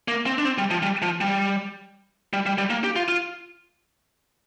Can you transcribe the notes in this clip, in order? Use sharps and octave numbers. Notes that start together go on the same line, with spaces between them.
A#3
C4
D4
C4
G3
F3
G3
F3
G3
G3
G3
G3
A#3
G4
F4
F4